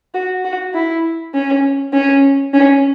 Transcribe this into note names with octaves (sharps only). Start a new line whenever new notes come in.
F#4
F#4
E4
C#4
C#4
C#4